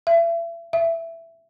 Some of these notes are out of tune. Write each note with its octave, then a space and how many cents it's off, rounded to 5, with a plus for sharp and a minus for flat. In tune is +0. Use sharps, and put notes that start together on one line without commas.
E5 +35
E5 +10